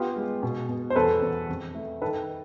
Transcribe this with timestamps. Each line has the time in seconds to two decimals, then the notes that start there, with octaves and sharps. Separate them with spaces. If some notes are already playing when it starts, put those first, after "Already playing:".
Already playing: B3 F4 G4
0.16 G#3
0.43 B2
0.69 B2
0.90 C5
0.96 E2 A4 B4
1.22 E2
1.49 F2
1.75 A3
2.02 D#3 A4 B4